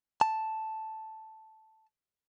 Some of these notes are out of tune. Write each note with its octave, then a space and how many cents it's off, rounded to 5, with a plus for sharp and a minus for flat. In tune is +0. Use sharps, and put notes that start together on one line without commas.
A5 +0